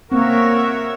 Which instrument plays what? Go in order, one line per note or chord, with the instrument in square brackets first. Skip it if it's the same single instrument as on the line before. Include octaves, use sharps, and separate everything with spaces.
[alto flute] A#3 [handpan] C4 [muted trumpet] F#4 [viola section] A#4 C#5 E5